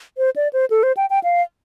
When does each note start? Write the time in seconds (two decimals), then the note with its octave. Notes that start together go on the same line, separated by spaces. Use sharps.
0.18 C5
0.36 D5
0.53 C5
0.70 A4
0.83 C5
0.97 G5
1.10 G5
1.24 F5